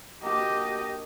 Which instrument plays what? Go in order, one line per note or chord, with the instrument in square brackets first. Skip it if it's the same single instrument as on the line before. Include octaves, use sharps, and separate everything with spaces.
[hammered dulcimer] A#3 D4 F#4 [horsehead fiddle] G4 D#5